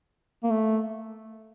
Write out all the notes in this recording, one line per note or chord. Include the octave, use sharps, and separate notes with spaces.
A#3
A3